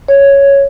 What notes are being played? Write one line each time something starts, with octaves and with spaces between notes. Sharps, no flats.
C#5